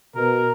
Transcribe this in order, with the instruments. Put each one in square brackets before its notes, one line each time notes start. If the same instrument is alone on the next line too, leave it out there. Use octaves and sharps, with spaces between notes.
[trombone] B2 [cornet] A#4